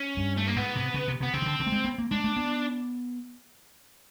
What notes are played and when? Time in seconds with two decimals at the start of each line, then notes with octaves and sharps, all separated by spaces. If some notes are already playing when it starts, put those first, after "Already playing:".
Already playing: C#4
0.17 G2
0.37 A3
0.47 A#3
0.56 G#2 B3
0.75 C3
0.94 C#3
1.08 C3
1.20 C3 B3
1.34 C#3 C4
1.42 D#3
1.46 D3
1.60 D3
1.67 A3
1.72 G#3
1.85 B3
1.98 A#3
2.11 G#3 D4
2.24 A3
2.36 B3